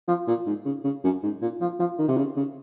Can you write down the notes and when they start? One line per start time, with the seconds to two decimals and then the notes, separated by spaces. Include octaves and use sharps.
0.08 F3
0.28 A#2
0.47 G#2
0.66 C#3
0.84 C#3
1.04 F#2
1.23 G#2
1.41 A#2
1.61 F3
1.79 F3
1.98 D#3
2.08 C3
2.17 C#3
2.37 C#3